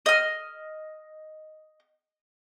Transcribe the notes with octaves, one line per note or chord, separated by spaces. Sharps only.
D#5 F6